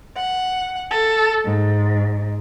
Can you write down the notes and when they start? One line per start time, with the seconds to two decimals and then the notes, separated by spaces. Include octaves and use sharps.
0.16 F#5
0.89 A4
1.46 G#2